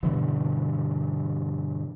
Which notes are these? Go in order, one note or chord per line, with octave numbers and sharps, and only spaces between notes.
G2 B2 D3 E3